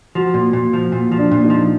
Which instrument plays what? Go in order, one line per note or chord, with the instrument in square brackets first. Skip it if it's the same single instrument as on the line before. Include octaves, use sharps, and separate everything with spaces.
[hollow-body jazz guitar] F3 [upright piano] F#4
[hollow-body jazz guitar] A#2
A#2
F3
A#2
F3
[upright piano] D4
[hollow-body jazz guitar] A#2
[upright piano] D#4
[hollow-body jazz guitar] F3